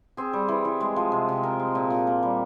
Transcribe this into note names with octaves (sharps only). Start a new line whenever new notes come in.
C4 G#4
G3
E3
E3
G#3
F3
C3
C3
C4 A#4
G#3
A#2
A#2
A#3
G3